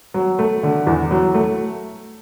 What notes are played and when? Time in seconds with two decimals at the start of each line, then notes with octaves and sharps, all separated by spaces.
0.14 F#3
0.39 A3
0.63 D3
0.87 E2
1.11 F#3
1.35 A3